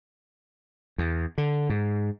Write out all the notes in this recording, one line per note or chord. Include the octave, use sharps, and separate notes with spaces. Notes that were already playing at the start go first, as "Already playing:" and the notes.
E2
D3
G#2